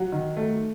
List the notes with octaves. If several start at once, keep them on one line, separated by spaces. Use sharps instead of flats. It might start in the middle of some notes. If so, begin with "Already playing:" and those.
Already playing: F#3 F#5
D#3
A3